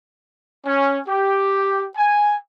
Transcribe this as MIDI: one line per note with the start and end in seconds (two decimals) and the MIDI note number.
0.67 1.00 61
1.08 1.86 67
1.97 2.36 80